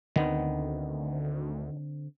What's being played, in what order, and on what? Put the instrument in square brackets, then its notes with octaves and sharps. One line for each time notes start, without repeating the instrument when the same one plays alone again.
[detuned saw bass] D2 [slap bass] D3 C4 [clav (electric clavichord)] D#3 B3